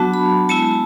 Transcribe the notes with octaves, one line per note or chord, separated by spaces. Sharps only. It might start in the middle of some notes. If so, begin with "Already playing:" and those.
Already playing: F#3 B3 D4 F#4 A5
B5
G#3 B3 E4 A5